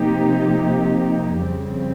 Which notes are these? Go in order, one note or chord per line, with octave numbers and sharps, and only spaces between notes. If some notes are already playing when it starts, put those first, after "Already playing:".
Already playing: C3 F3 A#3 D#4 G4
F2 C#3 G3 C4